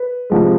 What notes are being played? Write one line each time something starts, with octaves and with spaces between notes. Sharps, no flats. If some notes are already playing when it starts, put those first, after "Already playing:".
Already playing: B4
C3 F3 G#3